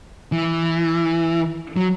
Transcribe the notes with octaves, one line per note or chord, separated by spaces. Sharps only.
E3
F#3